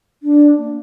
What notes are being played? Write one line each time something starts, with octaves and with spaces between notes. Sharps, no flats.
D4
A#3